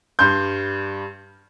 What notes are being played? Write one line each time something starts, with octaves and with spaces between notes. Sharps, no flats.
G2 G3 C6 G6